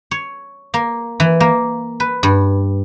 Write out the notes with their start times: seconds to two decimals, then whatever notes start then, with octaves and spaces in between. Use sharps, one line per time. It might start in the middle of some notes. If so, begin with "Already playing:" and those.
0.11 C#5
0.74 A#3
1.20 E3
1.40 A#3
2.00 B4
2.23 G2